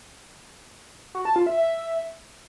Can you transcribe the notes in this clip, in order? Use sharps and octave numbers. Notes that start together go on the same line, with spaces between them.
F#4
A5
F4
E5
E5